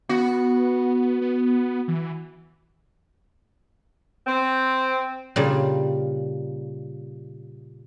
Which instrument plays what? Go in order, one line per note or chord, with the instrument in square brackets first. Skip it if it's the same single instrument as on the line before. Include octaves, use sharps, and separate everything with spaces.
[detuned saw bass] B3 [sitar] F#4
[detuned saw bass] B3
E3
[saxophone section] C4
[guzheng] A#2 C#3 G3